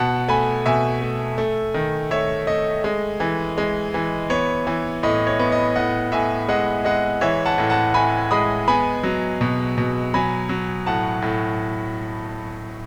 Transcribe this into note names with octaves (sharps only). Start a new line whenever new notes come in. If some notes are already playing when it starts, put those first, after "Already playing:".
Already playing: B2 F#5 A5
A3 G#5 B5
B2 E5 G#5
A3
A3
D#3
A3 C#5 E5
A3 D#5
G#3
E3
G#3
E3
B3 C#5
E3
A2 D#5
C#5
B3
D#5
A2 D#5 F#5
A2 E5 G#5
G#3 D#5 F#5
G#3 D#5 F#5
E3 C#5 E5
F#5 A5
A2
F#5 A5
A2 G#5 B5
G#3 B5 D#6
B3 G#5 B5
F#3
B2
B2
F#3 G#5 B5
F#3
A2 F#5 A5
A2